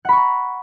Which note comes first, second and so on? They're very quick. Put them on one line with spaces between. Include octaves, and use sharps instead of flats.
F#5 B5 C#6 A#5